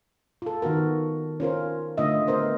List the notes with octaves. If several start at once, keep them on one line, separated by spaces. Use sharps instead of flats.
F4 A4
D#3 B3 F#4 A#4
C#4 F4 A#4 C5
D3 A3 F4 D#5 E5
B3 A#4 C5 D#5